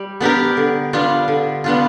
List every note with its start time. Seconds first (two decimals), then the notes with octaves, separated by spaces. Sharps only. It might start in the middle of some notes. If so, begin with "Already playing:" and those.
Already playing: G3
0.20 B3 D4 G4 A#4
0.57 D3
0.93 G3 B3 D4 F4
1.28 D3
1.64 G3 B3 D4 F4